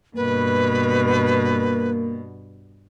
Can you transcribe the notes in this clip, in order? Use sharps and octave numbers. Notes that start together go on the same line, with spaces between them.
G2 B2 A#3 B4